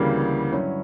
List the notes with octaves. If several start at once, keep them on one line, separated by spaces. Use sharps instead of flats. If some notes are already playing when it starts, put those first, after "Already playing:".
Already playing: D2 C#3 E3 G3 A#3
G2 D3 F#3 C#4 E4